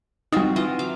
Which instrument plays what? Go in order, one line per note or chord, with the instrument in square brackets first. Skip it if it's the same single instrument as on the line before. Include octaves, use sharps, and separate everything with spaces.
[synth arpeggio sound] G3 D#4 [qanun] C4 F4 F#4
[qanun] E3 F4 D#5
F#3 F5 D6